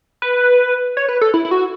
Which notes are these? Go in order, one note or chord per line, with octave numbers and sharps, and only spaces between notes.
B4
C#5
B4
A4
E4
E4
F#4